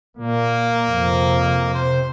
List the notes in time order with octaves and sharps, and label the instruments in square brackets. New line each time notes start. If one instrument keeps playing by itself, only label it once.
[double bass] A#2 [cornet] A#3
[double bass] F2 C3
[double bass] C3 [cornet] C5